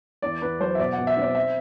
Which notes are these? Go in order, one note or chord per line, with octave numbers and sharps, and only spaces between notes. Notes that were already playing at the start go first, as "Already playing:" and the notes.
E2 D5
E2 B4
F#3 C5
E5
B2 D5
F#5
B2
E5
C4 D5
E5